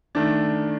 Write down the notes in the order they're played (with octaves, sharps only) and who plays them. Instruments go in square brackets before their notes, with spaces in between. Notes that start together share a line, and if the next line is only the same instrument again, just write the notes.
[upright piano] D#3 A3 D4